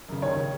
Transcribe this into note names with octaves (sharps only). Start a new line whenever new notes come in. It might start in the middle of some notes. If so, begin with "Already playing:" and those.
F#2 C#3
D#2 C#5
C#3